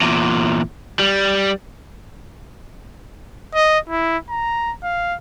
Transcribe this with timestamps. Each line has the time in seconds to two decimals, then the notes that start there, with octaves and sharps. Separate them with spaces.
0.02 E2 A#2
0.99 G3
3.55 D#5
3.89 E4
4.30 A#5
4.83 F5